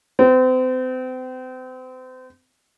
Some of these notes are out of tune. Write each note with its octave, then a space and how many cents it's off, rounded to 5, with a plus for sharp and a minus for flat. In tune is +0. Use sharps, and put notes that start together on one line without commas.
C4 -35